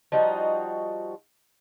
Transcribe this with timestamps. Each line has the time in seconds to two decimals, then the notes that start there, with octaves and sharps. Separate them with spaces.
0.12 F3 G3 D#4 F#4